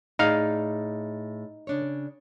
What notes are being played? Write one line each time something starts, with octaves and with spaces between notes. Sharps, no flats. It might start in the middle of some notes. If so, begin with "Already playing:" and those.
A2 D#4 G#4 D5 F5
C#3 D4 C#5